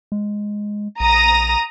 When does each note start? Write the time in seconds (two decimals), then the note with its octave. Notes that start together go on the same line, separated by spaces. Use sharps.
0.12 G#3
1.00 A#1 A#5 D#6 A#6